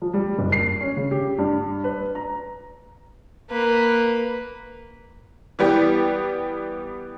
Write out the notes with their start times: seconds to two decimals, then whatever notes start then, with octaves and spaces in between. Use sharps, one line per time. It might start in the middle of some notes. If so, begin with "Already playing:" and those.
0.02 F3
0.14 G3
0.39 F#1
0.52 C7
0.81 C#4
0.97 C#3
1.11 G4
1.38 G2
1.84 B4
2.15 A#5
3.51 A#3 B4
5.59 E3 G3 B3 G4